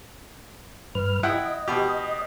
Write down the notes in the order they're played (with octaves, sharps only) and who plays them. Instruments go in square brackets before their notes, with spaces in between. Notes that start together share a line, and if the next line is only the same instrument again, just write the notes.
[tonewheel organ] G2 B4 F6
[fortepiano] E4 F#5 G5 [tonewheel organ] D#5
[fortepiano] B2 G4